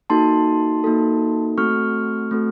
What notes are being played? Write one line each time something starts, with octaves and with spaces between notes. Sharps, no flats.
A#3 D#4 F#4 A4 A5 C6
A#3 D#4 F#4 A4
A3 C4 F#4 A4 C#6 F6
A3 C4 F#4 A4